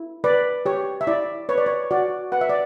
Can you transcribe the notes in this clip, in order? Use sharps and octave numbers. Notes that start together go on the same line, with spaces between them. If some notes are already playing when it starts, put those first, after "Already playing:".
Already playing: E4
B4 D5
G4 C#5
E5
E4 D5
B4 C#5
D5
C#5
F#4 D5
B4 F#5
E5
D5